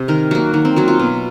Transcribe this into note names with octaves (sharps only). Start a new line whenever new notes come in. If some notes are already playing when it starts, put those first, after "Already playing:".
Already playing: C3
D#3 A#4
F#3 A#3 F#4
D#3 F#4
C4
F#3 A#3 F#4
F4
B2